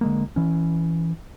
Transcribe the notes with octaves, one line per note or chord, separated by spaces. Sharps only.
D3 G#3 A#3
E3 C#4